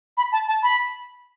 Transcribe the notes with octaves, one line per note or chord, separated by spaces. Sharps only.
B5
A5
A5
B5